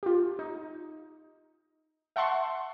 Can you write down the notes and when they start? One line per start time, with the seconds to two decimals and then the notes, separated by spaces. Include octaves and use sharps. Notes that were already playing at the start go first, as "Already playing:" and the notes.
0.03 F4 G4
0.39 D#4
2.16 E5 F#5 A5 C6 C#6